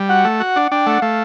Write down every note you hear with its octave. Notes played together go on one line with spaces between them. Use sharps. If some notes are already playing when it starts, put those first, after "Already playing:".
Already playing: G3
F#4 F#5
A3
F#4
D4
D4 G5
A3 F#5
A3 F5